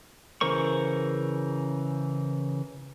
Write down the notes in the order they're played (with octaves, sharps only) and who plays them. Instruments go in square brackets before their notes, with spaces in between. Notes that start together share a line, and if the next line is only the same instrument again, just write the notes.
[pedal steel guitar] C#3 E3 A#4 C5 C#6